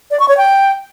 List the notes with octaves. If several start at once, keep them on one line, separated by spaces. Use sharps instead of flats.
D5
C#6
C#5
G5